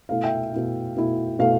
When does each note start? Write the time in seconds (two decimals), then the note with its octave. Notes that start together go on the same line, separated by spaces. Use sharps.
0.09 B2 A3 E4 F5
0.24 E5 G5
0.53 B2 A3 E4
0.96 B2 A3 E4
1.39 B2 A3 E4 F5